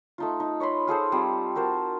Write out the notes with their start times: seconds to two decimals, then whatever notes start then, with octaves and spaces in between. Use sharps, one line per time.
0.18 A3 D#4 F4
0.40 D#4
0.60 C#5 D#5 B5 C6
0.87 F4 G#4 A4 C5
1.12 G3 C4 F4
1.55 F#4 A#4 C5 A5